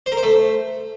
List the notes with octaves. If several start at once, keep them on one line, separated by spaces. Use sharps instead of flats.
C5
A#4
C5
A3